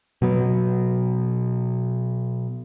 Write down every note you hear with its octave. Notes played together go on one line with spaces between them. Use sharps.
B2 F#3 B3